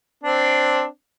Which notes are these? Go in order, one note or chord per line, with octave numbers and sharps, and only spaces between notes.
C4 D4